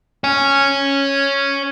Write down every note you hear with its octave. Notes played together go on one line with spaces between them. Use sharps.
C#5 G#5